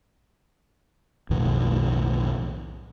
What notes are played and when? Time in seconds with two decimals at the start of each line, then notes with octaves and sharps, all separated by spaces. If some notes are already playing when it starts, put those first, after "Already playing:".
1.30 B1 F2 A2 D#3